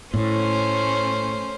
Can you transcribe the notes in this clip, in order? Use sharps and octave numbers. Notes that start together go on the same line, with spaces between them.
A2 A3 C#4 C5